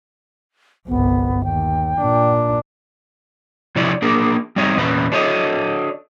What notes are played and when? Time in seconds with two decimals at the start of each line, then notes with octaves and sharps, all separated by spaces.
0.88 G1 C2 B3
1.44 D#2 G5
2.01 A#2 D4
3.76 C3 F3 E4 C#5 D5
4.02 A#3 D4 G#4 A#4
4.56 G3 C4 D#4 C#5 D#5
4.77 E2 A#2 C#4 B4
5.12 D4 F#4 A4 C#5 D#5